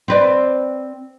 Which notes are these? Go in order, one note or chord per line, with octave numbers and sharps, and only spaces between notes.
C4 B4 D5